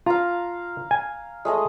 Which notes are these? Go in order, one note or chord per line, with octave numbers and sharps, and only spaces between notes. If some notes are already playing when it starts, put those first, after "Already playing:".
F4 F5 A#5
G#5
G#3 A3 D#5